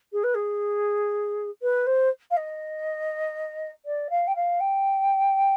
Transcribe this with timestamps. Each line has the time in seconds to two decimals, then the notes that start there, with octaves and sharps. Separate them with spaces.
0.13 G#4
0.24 B4
0.35 G#4
1.62 B4
1.87 C5
2.31 F5
2.37 D#5
3.85 D5
4.10 F5
4.27 G5
4.36 F5
4.60 G5